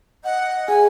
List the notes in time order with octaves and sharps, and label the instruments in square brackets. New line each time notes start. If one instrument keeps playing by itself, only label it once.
[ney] D#5 [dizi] F#5
[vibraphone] G#4 [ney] G#5